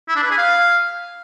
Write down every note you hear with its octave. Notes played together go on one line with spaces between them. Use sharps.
E4
D4
B4
G#4
F5